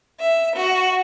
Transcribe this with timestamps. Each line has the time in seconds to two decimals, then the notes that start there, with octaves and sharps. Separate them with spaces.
0.21 E5
0.56 F#4